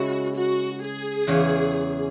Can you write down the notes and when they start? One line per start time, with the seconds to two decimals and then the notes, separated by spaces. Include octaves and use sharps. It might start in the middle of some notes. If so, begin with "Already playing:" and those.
Already playing: C#3 G#3 E4 F#4 B4
0.36 F#4
0.82 G#4
1.27 E2 C#3 E3